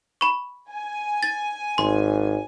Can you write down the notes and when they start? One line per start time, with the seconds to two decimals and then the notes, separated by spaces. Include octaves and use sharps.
0.21 B5 C#6
0.70 G#5
1.23 A6
1.78 G#1 C6